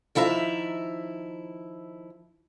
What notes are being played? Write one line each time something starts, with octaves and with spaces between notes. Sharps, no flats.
D#3 F3 E4 E5 A#5